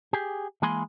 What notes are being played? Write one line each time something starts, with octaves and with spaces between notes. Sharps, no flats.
G4 G#4
E3 G#3 A#3 G#5 B5 C6